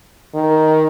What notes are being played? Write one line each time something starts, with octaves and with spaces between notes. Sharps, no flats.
D#3